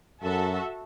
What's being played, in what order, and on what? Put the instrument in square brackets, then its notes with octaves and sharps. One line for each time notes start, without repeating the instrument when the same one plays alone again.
[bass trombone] F#2 [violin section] F#4 A4 E5 A5